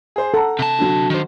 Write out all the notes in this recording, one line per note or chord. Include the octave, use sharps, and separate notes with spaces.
G#4 C5
A4 F#5 A#5
C3 A5
D3 F#3
D#3 C5